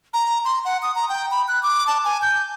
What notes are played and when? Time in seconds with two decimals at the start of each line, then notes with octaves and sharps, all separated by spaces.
0.13 A#5
0.45 C6
0.65 F#5
0.83 D#6
0.96 A#5
1.09 G5
1.31 B5
1.48 F#6
1.63 D6
1.87 A5
2.05 G#5
2.22 G6